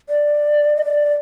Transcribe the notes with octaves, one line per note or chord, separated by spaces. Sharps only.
D5
D#5
D5